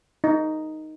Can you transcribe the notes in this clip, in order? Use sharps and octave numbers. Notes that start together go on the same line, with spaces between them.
D#4